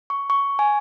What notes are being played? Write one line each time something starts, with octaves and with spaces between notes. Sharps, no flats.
C#6
C#6
G#5